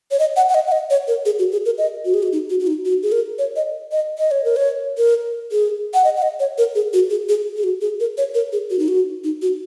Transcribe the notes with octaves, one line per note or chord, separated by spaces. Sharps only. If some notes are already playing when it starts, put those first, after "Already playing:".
C#5
D#5
F#5
F#5
D#5
F#5
D#5
C#5
A#4
G#4
F#4
G#4
A#4
D#5
F#4
G#4
F#4
D#4
F#4
F#4
D#4
F#4
G#4
A#4
C#5
D#5
D#5
D#5
C#5
A#4
C#5
A#4
G#4
F#5
D#5
F#5
D#5
C#5
A#4
G#4
F#4
G#4
G#4
G#4
F#4
G#4
A#4
C#5
A#4
G#4
F#4
D#4
F#4
D#4
F#4